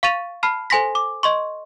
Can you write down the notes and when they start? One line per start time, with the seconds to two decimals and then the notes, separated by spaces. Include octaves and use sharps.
0.03 F5 C#6 A6 D#7 F7
0.43 A5 B5 F6 C7
0.70 A4 C5 G#5 C6 A#6 B6
0.95 D6
1.23 D#5 C6 C#6